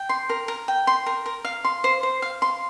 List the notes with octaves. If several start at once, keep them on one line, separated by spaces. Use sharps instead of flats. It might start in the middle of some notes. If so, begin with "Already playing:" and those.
Already playing: G5
C6
A#4
A#4
G5
C6
A#4
A#4
F5
C6
C5
C5
F5
C6